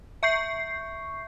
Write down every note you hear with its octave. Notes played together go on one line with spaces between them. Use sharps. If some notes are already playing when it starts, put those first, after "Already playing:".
E5 C#6 G6 C7